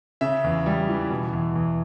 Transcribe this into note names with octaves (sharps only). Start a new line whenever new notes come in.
C#3 E5
E2
G3
E3
B2
E2
E2